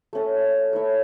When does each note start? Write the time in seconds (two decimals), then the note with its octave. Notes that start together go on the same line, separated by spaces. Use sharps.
0.13 A3 C#4 A4
0.73 A3 E4 C#5 E5